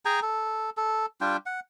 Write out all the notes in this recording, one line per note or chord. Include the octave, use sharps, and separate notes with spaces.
G#4 G5 G#5 A#5
A4
A4
G3 D4 F4 G5
F#5